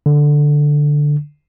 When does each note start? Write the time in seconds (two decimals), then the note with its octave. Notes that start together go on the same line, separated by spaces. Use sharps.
0.06 D3